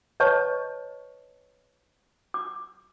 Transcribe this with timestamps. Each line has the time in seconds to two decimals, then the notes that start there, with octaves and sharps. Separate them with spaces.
0.20 B4 C#5 D#5 A5 C#6
2.34 D6